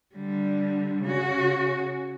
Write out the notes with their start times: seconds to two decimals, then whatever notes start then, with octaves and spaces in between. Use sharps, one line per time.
0.15 D3 G3
1.03 C#3 F#4